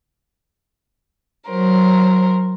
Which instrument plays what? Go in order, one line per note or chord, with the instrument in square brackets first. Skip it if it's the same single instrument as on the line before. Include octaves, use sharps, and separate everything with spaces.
[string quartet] F#3 A#4 C5